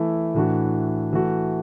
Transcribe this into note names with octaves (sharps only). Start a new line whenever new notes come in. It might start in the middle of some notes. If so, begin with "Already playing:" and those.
Already playing: E3 A3 E4
A2 E3 D4 F#4
E3 A3 F#4